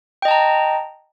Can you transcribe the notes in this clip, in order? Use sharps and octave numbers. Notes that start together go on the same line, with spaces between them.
D#5 G5 A5 A#5